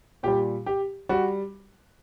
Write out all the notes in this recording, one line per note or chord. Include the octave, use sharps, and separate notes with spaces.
A#2 G3 G4
G4
G3 F#4